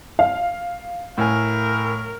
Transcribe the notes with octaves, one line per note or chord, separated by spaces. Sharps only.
F5
A2 A#4 G#5